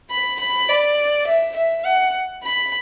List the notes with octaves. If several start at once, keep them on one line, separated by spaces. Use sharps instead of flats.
B5
B5
D5
E5
E5
F#5
B5